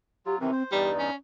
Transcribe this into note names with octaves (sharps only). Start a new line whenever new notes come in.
F#3 F4 G4
C3 D#3 E3 C4
C5
E2 G2 G3 D#4 D5
C#4